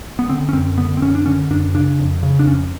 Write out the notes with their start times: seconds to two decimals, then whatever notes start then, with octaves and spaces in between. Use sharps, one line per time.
0.19 B3
0.29 D3 C4
0.49 C#4
0.53 F#2 C4
0.78 D3 B3
0.97 C4
1.02 F#2 C#4
1.15 D4
1.26 D3 C#4
1.51 F#2 D4
1.75 C#3 D4
1.99 F2
2.23 C#3
2.39 D4
2.46 F2 C#4